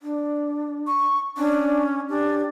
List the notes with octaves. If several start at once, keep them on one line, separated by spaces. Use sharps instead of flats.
D4
C#6
C#4 D4
D4 G4